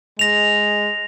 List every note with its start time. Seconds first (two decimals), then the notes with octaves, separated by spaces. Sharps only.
0.19 G#3 A#6 F7